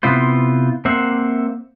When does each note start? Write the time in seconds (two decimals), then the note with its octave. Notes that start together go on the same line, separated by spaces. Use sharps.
0.03 C3 B3 E4 F4 C5
0.85 A#3 C4 C5 E5 F#5